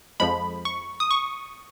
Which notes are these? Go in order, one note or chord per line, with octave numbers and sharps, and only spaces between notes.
F2 F3 G#3 B5
C#6
D#6
C#6